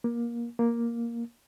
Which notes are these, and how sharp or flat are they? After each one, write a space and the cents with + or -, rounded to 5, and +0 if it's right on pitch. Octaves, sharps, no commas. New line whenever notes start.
A#3 +20
A#3 +5